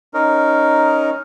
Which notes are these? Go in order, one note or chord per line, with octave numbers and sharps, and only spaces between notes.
C#4 D#4 A#4